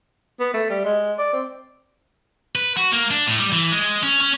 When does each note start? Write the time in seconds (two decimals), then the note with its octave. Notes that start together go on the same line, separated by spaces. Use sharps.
0.40 B3
0.54 A3
0.70 G3
0.85 G#3
1.19 D5
1.33 C4
2.55 B4
2.77 F#4
2.92 A#3
3.11 D4
3.27 A2
3.39 G3
3.52 E3
3.72 G#3
4.03 C#4
4.21 C#4